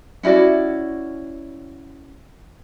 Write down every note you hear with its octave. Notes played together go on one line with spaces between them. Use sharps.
C#4 E4 F#4 D5